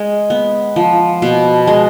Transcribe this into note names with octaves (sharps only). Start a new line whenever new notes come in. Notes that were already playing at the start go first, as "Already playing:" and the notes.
Already playing: G#3
B3
F3
B2
G#3